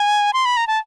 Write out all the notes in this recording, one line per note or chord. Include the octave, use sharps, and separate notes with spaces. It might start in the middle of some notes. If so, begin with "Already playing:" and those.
Already playing: G#5
C6
B5
A#5
A5